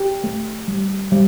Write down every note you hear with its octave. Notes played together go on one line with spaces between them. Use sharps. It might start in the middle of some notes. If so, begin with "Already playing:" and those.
Already playing: G4
A3
G3
G3